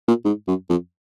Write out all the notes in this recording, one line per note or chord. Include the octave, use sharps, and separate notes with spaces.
A#2
G#2
F#2
F2